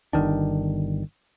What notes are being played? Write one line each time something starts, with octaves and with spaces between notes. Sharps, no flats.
G1 C2 D#3 D4